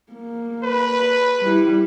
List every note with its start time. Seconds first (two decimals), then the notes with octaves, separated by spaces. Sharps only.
0.12 A#3
0.63 B4
1.42 G3 E4